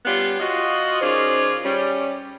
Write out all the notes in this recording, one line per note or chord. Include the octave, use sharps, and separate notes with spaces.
G3 B3 C#4 F4 G4
F4 F#4 D#5
D#3 C#4 F4 G#4 C5 D5
G3 C#4